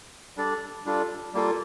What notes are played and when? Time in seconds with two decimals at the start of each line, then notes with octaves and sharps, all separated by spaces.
0.37 G3 D4 A4 D5
0.86 G3 D4 F4 A4
1.34 G3 A#3 F4 A4